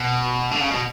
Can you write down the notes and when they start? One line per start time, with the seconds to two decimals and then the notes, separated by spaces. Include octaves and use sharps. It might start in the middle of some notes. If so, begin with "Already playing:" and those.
Already playing: B2
0.51 D3
0.60 C#3
0.71 B2